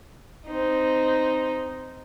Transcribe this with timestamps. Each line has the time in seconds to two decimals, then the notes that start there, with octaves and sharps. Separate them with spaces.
0.46 C4 D#4